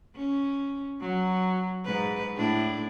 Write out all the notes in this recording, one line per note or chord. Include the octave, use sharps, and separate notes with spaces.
C#4
F#3
G#2 B4
A2 D4 E4